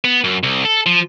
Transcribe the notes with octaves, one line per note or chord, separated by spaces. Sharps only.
B3
F#2
C2
A4
F3